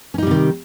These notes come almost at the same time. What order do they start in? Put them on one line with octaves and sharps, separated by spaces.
C#4 D#4 G3 C3 D#3